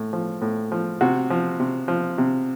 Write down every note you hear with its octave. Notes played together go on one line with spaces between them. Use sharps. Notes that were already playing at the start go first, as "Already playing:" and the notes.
Already playing: A2
F3
A2
F3
C3 F#4
F3
C3
F3
C3